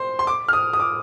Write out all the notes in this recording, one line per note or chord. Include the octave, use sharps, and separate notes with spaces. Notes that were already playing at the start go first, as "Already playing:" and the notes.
Already playing: C5 C6
C6
D6
F6
D#6
D#6
D6